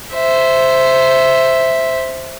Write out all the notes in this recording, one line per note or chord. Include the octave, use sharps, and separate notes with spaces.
C5 E5